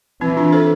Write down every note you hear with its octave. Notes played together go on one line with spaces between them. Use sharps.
E3 C4 E4
D4 F4
A4 C5